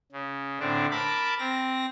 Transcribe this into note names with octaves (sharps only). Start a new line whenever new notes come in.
C#3
A2 D3 C4 D4
A#4 A5 B5 D6
C4 A#6